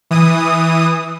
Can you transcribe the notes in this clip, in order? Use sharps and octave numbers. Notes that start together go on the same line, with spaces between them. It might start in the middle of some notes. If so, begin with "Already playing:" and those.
E3 D#6